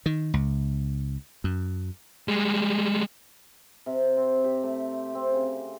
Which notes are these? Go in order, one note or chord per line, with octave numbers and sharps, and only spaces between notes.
D#3
C#2
F#2
G3 G#3
C3
C4
G4
A3
C4
C#3